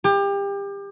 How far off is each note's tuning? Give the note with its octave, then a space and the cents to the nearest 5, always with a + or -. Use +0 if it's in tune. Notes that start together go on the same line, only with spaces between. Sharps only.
G4 +30